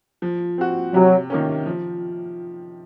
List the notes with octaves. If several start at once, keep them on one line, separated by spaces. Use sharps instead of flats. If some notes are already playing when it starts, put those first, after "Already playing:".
F3
C4 F#4
C3 F#3
D#3 A#3 C#4
F3